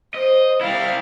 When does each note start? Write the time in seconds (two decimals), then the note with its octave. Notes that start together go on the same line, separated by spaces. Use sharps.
0.14 C5 D#5
0.61 G3 E4 F5